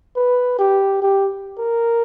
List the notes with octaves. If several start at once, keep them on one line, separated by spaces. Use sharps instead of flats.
B4
G4
G4
A#4